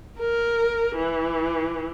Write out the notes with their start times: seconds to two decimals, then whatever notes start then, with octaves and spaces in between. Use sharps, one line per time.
0.19 A#4
0.95 E3